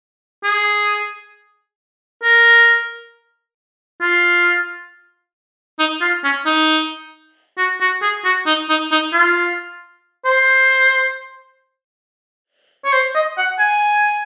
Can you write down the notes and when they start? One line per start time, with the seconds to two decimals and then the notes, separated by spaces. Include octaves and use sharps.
0.44 G#4
2.23 A#4
4.01 F4
5.79 D#4
6.01 F4
6.24 C#4
6.46 D#4
7.57 F#4
7.80 F#4
8.02 G#4
8.24 F#4
8.46 D#4
8.69 D#4
8.91 D#4
9.13 F4
10.25 C5
12.85 C#5
12.93 C5
13.15 D#5
13.38 F#5
13.59 G#5